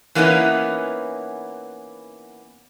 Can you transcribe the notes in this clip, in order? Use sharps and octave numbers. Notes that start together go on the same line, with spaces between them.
E3 A#3 B3 C#4 D#4 E4